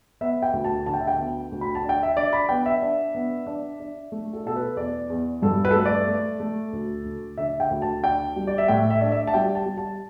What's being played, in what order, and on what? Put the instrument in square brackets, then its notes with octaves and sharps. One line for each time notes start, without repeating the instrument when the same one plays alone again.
[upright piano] B3 E5
G5
D2
A5
D3 A5
G5
E5
G5
B3
D2
B5
A5
D4 G5
E5
D4 D5
B5
B3 G5
E5
D4
B3
D4
D4
A3
A4
B2 A4
B4
E2 D5
E2
G2 A4
B4
A4
A3 B4
D5
A3
A3
D2
D2
D3 E5
G5
D2
A5
D4 G5
G3
D5
E5
A2 G5
E5
D4
E5
A5
G3 G5
A5
G3
A5